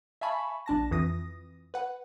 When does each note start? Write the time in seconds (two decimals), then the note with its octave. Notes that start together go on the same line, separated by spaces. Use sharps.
0.21 E5 F5 G#5 A5 B5 C#6
0.66 A#1 D4 A5 A#6
0.91 F2 E3 D#6 A#6
1.74 B4 F#5